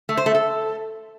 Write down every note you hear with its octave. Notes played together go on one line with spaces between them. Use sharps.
A3
C5
A3
A4